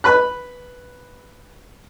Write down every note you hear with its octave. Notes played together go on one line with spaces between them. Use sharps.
B4 B5 F#6